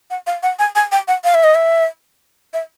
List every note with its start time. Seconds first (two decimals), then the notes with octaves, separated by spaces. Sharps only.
0.10 F#5
0.27 F5
0.43 F#5
0.59 G#5
0.75 G#5
0.92 G5
1.08 F#5
1.24 F5
1.34 E5
1.44 D#5
1.55 E5
2.53 E5